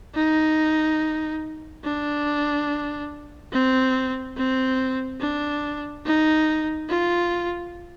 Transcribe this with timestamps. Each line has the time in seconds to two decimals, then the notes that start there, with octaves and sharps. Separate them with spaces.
0.15 D#4
1.84 D4
3.52 C4
4.37 C4
5.20 D4
6.06 D#4
6.89 F4